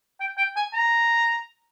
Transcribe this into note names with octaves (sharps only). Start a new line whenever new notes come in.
G5
G5
G#5
A#5